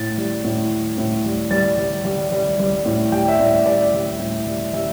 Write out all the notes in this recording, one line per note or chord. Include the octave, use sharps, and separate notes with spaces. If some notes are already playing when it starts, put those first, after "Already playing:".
Already playing: A2 A6
G3
A2
G3
A2
G3
G3 A6
G3
G3
G3
G3
A2
G3 G5
E5
A2 D5
G3 D5
G3
A2
G3
G3 E5